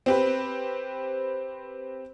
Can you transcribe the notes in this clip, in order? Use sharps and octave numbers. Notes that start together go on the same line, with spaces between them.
C4 G4 B4